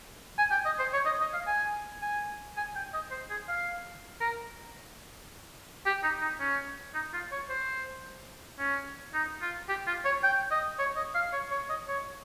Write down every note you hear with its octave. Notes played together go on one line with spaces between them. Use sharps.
G#5
G5
D#5
C5
C#5
D#5
D#5
F5
G#5
G#5
G#5
G5
D#5
C5
G#4
F5
A#4
G4
D#4
D#4
C#4
D#4
F4
C#5
C5
C#4
D#4
F4
G4
F4
C#5
G5
D#5
C#5
D#5
F5
C#5
C#5
D#5
C#5